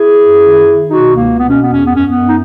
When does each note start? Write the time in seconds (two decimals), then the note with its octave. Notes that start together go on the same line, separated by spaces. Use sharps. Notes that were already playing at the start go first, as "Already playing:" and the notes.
Already playing: E4 G#4
0.18 F#2
0.42 D#3
0.67 D#3
0.90 B2 D#4 F#4
1.14 C#2 A#3
1.39 B2 B3
1.50 C#4
1.62 E2 B3
1.73 C#4
1.84 F#2 B3
1.95 C#4
2.06 B3
2.12 F#2
2.27 D#4